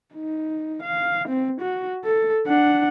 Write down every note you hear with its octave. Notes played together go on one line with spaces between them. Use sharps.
D#4
F5
C4
F#4
A4
D4 F#5